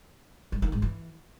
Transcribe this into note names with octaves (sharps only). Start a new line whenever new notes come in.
G2
D#3
G#2
E3